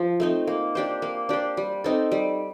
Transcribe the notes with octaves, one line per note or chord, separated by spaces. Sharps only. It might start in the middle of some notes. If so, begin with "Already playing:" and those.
Already playing: F3
A3 C4 D#4
A#3
D4 G4 C5
A#3
D4 G4 C5
G3
C4 D#4 A4
G3